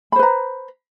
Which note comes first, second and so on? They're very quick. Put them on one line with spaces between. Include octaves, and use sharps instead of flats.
B5 C5 B4 A#5